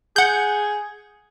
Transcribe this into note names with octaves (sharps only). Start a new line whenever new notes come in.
G#4 F#5 G6